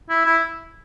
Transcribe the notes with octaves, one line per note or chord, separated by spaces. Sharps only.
E4
E4